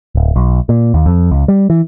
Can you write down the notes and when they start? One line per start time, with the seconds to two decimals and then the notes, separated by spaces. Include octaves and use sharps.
0.15 D1
0.36 B1
0.69 A#2
0.94 D#2
1.06 F2
1.31 C#2
1.48 G3
1.70 E3